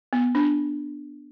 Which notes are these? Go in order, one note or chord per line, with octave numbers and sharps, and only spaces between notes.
B3
D4